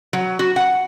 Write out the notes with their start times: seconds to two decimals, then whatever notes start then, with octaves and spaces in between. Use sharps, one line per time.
0.13 F#3
0.39 F#4
0.56 F#5